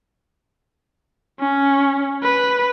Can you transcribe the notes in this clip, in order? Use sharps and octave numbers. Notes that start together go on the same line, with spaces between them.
C#4
B4